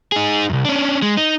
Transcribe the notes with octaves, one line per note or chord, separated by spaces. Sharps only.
D#4 G#4
C2 F#2
C#4 D4
G#3
D#4